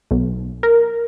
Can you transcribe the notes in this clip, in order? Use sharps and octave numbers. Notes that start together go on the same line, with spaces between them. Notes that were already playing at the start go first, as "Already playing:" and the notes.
B1
A#4